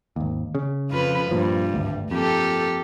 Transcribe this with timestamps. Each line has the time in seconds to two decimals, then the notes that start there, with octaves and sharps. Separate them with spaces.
0.16 G#1 D#2
0.55 C#3
0.90 F2 F4 B4
1.31 G2 A#2 F3
1.72 G#1 D2
2.11 F2 A#3 G4 A4